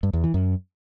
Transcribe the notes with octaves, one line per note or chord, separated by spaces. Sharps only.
G2
E2
E3
F#2